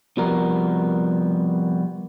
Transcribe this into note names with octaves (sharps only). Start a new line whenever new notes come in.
C3 F3 G3 B3 A#4